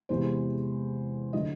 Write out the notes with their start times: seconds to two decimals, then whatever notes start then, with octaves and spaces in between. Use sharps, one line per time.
0.09 E2 C3 E3 G#3 C5
1.33 D3 F#3 A3 D#5